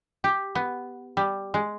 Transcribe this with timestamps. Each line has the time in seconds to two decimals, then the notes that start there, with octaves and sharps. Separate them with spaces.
0.24 G4
0.55 B3
1.17 G3
1.54 G#3